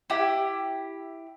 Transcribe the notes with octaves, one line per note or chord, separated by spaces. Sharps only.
E4 G4